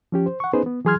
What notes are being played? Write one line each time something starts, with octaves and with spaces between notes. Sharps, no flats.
F3 C#4 G4
C5
F#5 C#6
B3 C#4 D#4 G#4 B4 C5
B3
E3 F#3 G#4 C6 F6 G#6